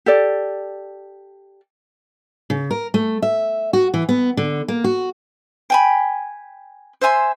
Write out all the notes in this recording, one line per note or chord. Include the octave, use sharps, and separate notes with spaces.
G4 A4 D5
C#3
A#4
A3
E5
F#4
E3
B3
D3
A#3
F#4
G5 G#5 B5
C5 E5 G#5 C6